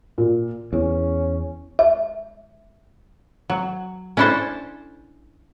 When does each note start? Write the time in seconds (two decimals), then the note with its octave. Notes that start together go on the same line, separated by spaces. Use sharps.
0.18 A#2
0.73 E2 C#4
1.79 E5
3.50 F#3
4.17 C#4 D4 E4 A4 C5 A5